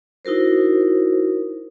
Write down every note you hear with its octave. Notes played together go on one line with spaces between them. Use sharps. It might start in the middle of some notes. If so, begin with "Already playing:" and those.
D#4 E4 F#4 A#4 C5